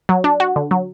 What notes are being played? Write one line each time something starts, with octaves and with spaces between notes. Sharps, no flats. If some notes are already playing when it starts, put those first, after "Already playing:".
F#3
D4
F#4
D3
F#3